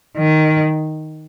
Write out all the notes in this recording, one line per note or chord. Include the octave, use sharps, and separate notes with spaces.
D#3